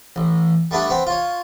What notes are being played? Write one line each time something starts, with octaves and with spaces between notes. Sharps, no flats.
A1
G3 A3 B3 D4
B3 C4
F4 C#5